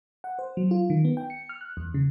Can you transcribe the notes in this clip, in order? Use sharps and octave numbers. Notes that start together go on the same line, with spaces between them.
F#5
C5
F#3
F4
D#3
B3
G5
C#7
F6
F#6
E2
C#3